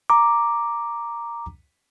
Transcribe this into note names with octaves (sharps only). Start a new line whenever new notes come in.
A#5 D6